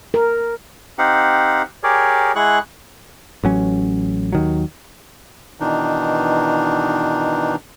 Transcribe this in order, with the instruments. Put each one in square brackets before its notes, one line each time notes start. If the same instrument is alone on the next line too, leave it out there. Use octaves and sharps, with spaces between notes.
[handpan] A#4
[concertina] C4 D#4 G4 F5 F#5
G4 G#4 A#4 C#5 D5
G#3 E4 G#4 F#5 C#6 F#6
[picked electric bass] A1 F#3 C#4
D#2 D#3 F#3
[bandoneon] B2 D#3 E3 D4 D#4